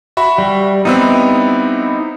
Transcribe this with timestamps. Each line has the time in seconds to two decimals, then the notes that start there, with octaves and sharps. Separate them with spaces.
0.17 F#4 E5 B5
0.38 G3
0.85 G3 B3 C4 D#4 E4 E6